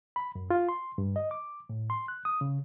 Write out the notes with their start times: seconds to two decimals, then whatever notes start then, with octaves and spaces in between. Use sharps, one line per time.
0.16 B5
0.35 F#2
0.50 F4
0.69 C6
0.98 G2
1.16 D#5
1.31 D6
1.69 A2
1.90 C6
2.08 F#6
2.25 D#6
2.41 C#3